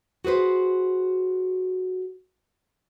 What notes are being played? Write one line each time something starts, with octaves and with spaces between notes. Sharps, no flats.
F#4 G#4 B4 C5